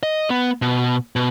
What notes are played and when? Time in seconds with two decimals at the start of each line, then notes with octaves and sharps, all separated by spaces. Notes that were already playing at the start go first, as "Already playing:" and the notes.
0.03 D#5
0.30 B3
0.62 B2
1.16 B2